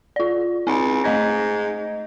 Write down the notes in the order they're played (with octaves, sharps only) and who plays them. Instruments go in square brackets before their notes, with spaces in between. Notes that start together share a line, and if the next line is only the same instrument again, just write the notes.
[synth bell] F4 D5
[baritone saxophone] C#2 [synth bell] C4
[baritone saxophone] G#2 [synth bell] A3 D#5 A#6